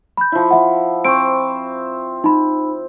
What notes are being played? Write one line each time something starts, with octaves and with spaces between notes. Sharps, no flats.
B5 G6
F3 E4
E5 F#5
C4 C#6 D7
D#4 B5